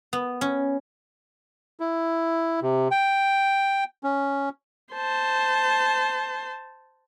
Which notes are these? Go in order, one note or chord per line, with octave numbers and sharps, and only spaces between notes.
B3
C#4
E4
C3
G5
C#4
C5 A5